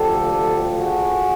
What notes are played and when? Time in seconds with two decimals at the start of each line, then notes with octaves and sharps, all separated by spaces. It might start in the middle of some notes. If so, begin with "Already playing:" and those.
Already playing: D2 D3 F3 G4 A4
0.78 F#4 G#4